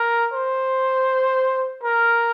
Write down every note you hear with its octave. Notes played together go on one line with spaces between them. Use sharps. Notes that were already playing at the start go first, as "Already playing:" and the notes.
Already playing: A#4
C5
A#4